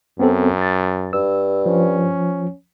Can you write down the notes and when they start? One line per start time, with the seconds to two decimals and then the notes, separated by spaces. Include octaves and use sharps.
0.19 F#2 B3 C4 A4
0.62 A6
1.13 G2 E6
1.66 F3 C#4